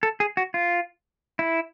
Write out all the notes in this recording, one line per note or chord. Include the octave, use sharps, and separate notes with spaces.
A4
G#4
F#4
F4
E4